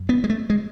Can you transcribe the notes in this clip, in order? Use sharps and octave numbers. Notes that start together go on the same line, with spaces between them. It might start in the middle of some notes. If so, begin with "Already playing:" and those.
Already playing: F#2
B3
G#3
A3
G#3